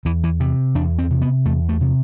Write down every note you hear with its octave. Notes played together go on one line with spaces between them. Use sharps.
E2 E3
E3
C3
E2 D4
C4
C3
B3
E2 A3
A3
C3